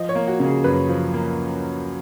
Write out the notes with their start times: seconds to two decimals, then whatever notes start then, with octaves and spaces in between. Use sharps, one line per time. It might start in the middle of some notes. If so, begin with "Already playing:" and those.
Already playing: F3 D#5
0.09 C#5
0.15 A#3
0.28 F#4
0.40 C#3
0.46 G#4
0.64 F#2 B4
0.89 F3
1.14 A#3